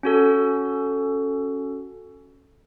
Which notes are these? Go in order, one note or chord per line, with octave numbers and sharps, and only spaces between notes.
C#4 F#4 A4